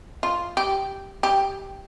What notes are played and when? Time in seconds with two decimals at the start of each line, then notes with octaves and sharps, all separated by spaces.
0.23 F4
0.57 G4
1.23 G4